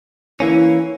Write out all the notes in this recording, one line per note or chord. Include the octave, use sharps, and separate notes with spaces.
E3 A#3 C#4 E4